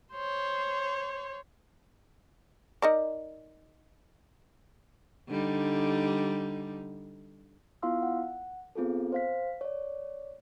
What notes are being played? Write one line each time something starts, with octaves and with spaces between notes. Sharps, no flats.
C5 C#5
D#4 A#4 D5
D3 G3 D#4
B3 E4 F4 F5 C6 E6
F#5
B3 C4 F4 G#4 A4
C5 F5 B6
C#5 D5